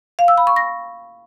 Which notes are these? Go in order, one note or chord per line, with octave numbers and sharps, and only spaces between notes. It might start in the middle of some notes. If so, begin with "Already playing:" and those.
F5
E6
B5
C#6
A#6